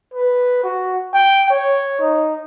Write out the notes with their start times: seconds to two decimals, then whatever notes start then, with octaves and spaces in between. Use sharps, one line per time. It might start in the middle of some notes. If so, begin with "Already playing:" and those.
0.14 B4
0.64 F#4
1.13 G5
1.50 C#5
2.00 D#4